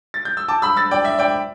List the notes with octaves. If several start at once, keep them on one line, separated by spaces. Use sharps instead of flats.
A6
G6
E6
A5 D6
B5 E6
E6 A6
D5 G5
E5
D5 G5